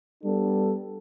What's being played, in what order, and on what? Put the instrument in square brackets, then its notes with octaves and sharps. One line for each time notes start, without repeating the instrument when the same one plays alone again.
[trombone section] G3 B3 D4 A4